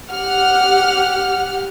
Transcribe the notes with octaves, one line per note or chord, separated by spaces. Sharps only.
G4 F#5 F6